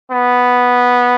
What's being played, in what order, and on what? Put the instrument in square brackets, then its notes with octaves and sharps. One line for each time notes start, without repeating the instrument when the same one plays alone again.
[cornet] B3